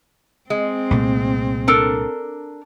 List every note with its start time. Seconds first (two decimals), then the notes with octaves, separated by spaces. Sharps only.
0.50 G#3 C4
0.91 C2 A#2 A3
1.68 D4 A4 A#4